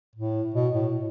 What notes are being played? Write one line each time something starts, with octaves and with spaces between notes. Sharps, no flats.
A2
B2
A2